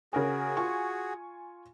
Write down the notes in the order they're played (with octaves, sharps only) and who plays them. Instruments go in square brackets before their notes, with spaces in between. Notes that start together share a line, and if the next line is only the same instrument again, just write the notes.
[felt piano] C#3 A#4 G#5 [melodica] F#4 G#4
[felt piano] F4 G#5 C#6